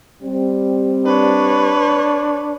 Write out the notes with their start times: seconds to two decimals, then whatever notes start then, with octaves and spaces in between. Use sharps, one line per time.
0.22 G3 C4
1.06 D4 B4 C#5